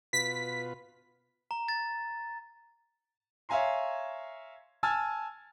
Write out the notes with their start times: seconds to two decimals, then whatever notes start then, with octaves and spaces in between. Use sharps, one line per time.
0.13 B2 F4 B4 B6
1.51 A#5
1.68 A6
3.49 C#5 E5 F5 G#5 A#5 C6
4.83 G#5 A5 E6 F6 G#6 A6